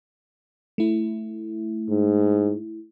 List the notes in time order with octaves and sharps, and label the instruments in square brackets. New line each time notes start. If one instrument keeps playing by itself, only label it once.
[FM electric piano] A3 E4
[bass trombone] G#2